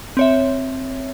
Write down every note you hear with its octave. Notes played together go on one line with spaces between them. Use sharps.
C4 C#5 E5